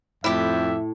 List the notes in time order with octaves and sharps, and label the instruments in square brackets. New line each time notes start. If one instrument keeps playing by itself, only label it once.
[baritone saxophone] F2 [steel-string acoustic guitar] A2 [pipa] E4 G4 [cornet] E5